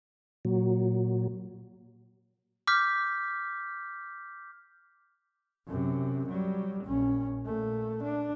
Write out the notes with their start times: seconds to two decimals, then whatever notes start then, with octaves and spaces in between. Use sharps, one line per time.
0.45 A#2 F#3
2.67 D6 F6 G6 B6
5.68 F#2 C3
6.29 F#3 G3
6.85 A#1 C#4
7.46 A#2 A3
8.04 D4